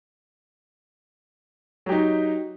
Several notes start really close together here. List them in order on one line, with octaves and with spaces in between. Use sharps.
F#3 G4 D#4